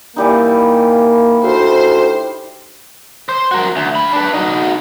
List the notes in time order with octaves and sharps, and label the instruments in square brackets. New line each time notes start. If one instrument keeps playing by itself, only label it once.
[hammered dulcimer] E3 G3 D#4 [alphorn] A#3
[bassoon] D2 [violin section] C5
[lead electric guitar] C5
F#4 A#4
D2
D4 B5
D4 B4
D#4 F#4